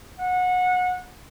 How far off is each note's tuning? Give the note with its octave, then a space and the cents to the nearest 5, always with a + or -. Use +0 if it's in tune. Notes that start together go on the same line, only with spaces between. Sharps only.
F#5 -25